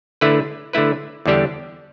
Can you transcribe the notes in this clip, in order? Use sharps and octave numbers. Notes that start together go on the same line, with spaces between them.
D3 A3 E4 B4
D3 A3 E4 B4
E2 D3 G3 D4 G4